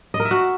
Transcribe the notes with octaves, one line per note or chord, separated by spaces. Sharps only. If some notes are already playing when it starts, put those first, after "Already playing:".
D#5
A#4
E5
F#4